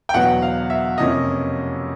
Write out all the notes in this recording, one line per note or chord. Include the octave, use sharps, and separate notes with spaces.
G5
E2 B2 F#3 B3 F#5
F5
E5
F2 C3 F3 A#3 C#4 D#5